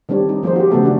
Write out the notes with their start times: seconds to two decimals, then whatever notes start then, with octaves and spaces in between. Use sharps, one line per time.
0.09 D#3 G3 C4 D4 C#5
0.29 D#4
0.43 F3 A#3 D#4 G#4 C5
0.56 F#4 G4
0.71 C#3 E3 F#3 A3 B3 A4
0.83 D#3 C#4 D4 F#4